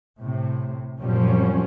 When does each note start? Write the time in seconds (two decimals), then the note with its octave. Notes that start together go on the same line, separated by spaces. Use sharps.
0.19 A2 C3
1.00 F#2 A#2 F3 G3 C4 C#4